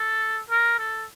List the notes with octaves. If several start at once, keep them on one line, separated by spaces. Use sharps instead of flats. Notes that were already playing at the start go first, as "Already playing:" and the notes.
Already playing: A4
A#4
A4